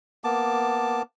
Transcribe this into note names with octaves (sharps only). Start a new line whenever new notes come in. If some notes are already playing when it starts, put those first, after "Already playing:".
A#3 B3 A5 D6